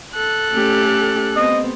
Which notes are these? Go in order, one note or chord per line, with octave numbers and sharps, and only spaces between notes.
A4 F#6
A3 C#4 G4
B3 C4 D#5